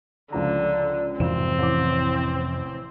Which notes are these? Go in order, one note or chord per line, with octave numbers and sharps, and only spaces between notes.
C#2 D3 F3 A#5
G#1 F2 C3 E3 C4 E7
A1 D6